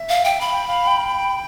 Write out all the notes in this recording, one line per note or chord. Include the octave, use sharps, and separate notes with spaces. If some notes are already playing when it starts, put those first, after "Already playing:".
Already playing: E5
F5
G5
F5 B5
G5
F5
G5